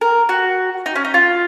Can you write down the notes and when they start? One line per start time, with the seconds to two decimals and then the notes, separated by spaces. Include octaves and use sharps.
0.01 A#4
0.29 F#4
0.86 D#4
0.96 C#4
1.05 D#4
1.14 F4